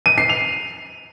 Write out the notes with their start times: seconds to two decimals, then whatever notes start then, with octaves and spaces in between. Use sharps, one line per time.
0.06 D#7
0.18 C7
0.29 F7